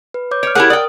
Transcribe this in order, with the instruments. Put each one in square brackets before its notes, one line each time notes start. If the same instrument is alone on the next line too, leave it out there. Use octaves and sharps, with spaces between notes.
[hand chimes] B4
C#5 D6 G6
[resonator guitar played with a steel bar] C#5 [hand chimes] F6 D7
[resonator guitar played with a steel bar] E4 G4 G#4 [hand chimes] A#4 [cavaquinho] F#5
[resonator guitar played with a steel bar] D5 G5 [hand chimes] D#6